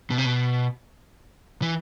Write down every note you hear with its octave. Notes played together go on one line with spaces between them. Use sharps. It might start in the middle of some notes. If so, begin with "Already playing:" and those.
B2
C3
B2
E3